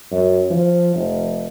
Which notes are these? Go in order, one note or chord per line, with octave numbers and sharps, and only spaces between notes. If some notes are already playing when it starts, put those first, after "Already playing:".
F#2
F3
F1